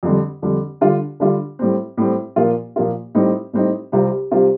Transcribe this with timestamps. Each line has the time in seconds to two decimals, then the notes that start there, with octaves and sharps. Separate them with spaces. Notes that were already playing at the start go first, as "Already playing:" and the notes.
0.03 F2 D3 G3
0.42 F2 D3 G3
0.81 D3 G3 D4 F4
1.20 D3 G3 D4 F4
1.59 A2 G3 C4
1.97 A2 G3 C4
2.36 A#2 F3 A#3 F4
2.76 A#2 F3 A#3 F4
3.15 A2 G3 C4 D#4
3.53 A2 G3 C4 D#4
3.92 C2 C3 G3 C4 F4
4.31 C2 C3 G3 C4 F4